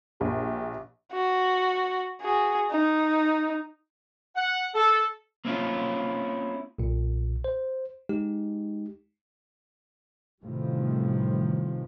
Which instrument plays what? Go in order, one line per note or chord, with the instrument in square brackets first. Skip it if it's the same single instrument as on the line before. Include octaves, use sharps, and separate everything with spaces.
[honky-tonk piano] A#1 [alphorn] G4
[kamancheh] F#4
F#4 G#4
D#4
[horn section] F#5
A4
[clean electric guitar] A#3 C4 C#4 E4 F4
[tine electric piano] B1 A#2
C5
G#3 D#4 G4
[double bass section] A1 A2 C3 D#3 F3 G3